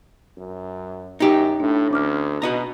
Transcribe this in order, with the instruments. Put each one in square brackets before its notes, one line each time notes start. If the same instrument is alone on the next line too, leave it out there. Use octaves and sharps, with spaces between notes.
[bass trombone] F#2
[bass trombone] F#2 [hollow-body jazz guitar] D#4 G4
[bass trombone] A2 [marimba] D4
[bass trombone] D2 [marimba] C#4 D6 F6
[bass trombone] B2 [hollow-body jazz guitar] F#4 D#5 A#5